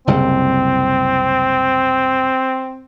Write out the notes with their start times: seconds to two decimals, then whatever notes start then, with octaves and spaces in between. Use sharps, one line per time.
0.07 F#1 C2 C#3 C4